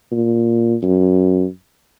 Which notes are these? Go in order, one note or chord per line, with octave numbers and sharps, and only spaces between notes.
A#2
F#2